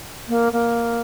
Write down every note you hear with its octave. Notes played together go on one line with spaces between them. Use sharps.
A#3
A#3